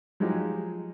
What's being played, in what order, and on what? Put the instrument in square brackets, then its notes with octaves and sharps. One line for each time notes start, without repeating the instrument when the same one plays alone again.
[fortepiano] F3 F#3 G#3 D#4 G4